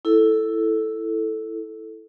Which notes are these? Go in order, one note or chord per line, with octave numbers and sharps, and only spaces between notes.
E4 A4